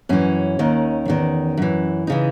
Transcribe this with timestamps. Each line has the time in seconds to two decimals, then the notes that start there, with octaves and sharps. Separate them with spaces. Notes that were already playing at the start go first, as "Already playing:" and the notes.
0.09 F#2 E3 C#4
0.59 D#2 D#3
1.08 E2 D#3
1.57 F#2 E3
2.07 C#3 E3 D#4